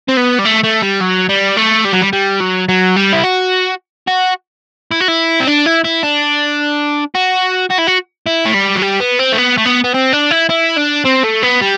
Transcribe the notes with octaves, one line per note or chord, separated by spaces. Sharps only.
C4
B3
G3
A3
A3
G3
F#3
G3
A3
G3
F#3
G3
G3
F#3
F#3
G3
E4
F#4
F#4
E4
F#4
E4
C4
D4
E4
E4
D4
F#4
F#4
E4
F#4
E4
A3
G3
F#3
G3
B3
C4
A3
B3
A3
B3
B3
C4
D4
E4
E4
D4
C4
A3
B3
G3